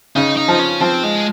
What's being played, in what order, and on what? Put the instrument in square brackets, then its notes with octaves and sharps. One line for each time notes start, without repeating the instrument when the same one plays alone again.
[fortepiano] C#3 [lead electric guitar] D#4
[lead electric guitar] D#4
[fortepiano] F3
[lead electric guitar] C#4
[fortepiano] F3 [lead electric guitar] C4
[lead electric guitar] G#3